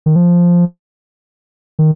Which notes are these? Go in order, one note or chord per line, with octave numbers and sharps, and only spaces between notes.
D#3
F3
D#3